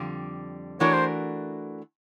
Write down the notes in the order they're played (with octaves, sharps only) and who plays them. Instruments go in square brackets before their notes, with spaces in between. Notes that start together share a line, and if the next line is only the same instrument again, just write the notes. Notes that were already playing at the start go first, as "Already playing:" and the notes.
Already playing: [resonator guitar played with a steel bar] F2 D3 G3
[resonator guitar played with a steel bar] E3 A3 D4 F#4 A#4 [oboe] C#5
[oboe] C5